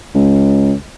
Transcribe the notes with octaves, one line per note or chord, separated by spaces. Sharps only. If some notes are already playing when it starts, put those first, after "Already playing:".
C#2